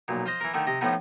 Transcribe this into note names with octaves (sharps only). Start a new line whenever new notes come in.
B1 A#2
F4 C5 D#5
E3 A#4
D3 D#3 A3
C3 D#5
A2 F3 B3 D#4